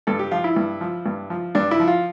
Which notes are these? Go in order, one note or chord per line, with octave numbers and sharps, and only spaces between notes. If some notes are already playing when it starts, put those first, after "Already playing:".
G2 A4
G4
F3 F4
E4
G2
F3
G2
F3
G2 D4
E4
F3
F4